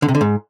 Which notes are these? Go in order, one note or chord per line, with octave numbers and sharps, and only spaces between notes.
D3
C3
D3
G#2